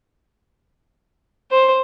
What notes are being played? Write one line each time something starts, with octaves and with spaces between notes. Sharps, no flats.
C5